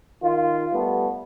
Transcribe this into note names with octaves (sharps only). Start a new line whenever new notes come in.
D#3 F4
G3 A3 B3